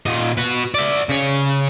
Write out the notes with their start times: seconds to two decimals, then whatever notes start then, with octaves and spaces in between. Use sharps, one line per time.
0.06 A#2 D#5
0.38 F#4 B4
0.75 D5 E5
1.09 C#3 C#5